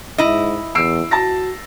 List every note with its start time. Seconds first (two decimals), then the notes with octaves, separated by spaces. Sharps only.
0.18 G#2 E4 D#5
0.75 E2 E6 C7 D7
1.11 F#4 A5 A6 A#6